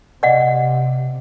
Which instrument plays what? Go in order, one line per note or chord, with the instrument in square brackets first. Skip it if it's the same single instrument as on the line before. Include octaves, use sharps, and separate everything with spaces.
[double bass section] C3 [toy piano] D5 D#5 F#5